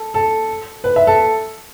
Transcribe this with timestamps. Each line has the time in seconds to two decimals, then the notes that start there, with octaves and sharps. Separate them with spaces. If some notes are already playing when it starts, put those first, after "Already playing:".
Already playing: A4
0.14 A4
0.84 B4
0.96 E5
1.07 A4